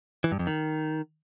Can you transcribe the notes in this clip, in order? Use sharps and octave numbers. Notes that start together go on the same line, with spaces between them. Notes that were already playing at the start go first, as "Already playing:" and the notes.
E3
G2
F2
D#3